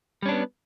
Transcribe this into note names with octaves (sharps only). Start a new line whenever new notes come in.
G3 B3 C#4 D4